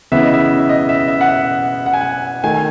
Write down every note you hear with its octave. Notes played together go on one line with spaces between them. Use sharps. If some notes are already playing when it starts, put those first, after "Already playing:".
C#3 E3 B3 E5
D#5
E5
E5
D#5
E5
E5
F#5
E5
F#5
G#5
F#5
D#3 A3 G#5
G#5